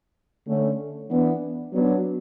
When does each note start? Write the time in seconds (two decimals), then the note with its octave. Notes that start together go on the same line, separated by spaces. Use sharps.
0.47 D3 A3 C#4
1.10 E3 B3 D4
1.73 F#3 B3 D4